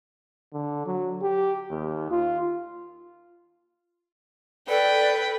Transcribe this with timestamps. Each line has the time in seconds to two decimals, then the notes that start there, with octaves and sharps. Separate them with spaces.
0.53 D3
0.86 F#3
1.22 G4
1.70 D#2
2.11 F4
4.69 A4 B4 D5 G5